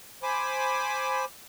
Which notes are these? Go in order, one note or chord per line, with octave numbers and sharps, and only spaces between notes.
C5 G#5 B5 D6